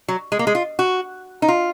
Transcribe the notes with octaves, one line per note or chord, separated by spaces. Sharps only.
F#3
G#3
A#3
G#3
F4
F#4
D#4
F4